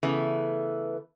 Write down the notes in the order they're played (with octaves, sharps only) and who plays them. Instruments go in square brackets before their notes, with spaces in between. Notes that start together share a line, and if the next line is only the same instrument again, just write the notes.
[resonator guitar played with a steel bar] C#3 E3 A3 B3